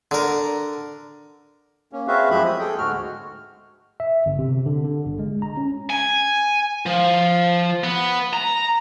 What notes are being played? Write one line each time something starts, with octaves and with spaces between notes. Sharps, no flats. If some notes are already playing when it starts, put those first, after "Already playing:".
D3 A#4
A#3 C#4
C4 F#4 G#4 B4 E5 F5
F#2 F3 G#3 G4 E5 B5
D#6
G#4 A4 G5
D2 G#2 G#3 F#4 F6
E5
G1
C3
D3
D3
G1
G#3
A#5
C#4
G#5
F3
B3
A#5